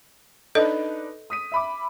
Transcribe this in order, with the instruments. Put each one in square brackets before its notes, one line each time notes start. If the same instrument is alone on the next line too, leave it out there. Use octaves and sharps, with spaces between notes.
[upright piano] D4 D#4 B4 [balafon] A4 D#5
[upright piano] D#6 B6 D#7
E5 B5 D6